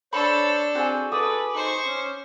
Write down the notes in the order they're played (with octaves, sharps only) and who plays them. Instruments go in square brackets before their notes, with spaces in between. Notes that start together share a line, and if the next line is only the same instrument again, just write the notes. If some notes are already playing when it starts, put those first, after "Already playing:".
[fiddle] D4 A4 [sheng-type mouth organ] C5 C#5 [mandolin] B5 C#6
[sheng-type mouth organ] C4 C5 [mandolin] F#4 G#4 G#5
[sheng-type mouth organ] A4 [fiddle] B4 [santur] D6 D#6
[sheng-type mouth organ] D#4 [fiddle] C5 C#6
[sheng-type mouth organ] C#4